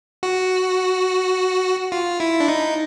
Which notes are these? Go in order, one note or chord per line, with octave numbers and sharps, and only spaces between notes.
F#4
F4
E4
D4
D#4